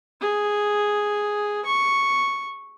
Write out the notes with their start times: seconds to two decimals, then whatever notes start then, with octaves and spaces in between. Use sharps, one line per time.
0.21 G#4
1.66 C#6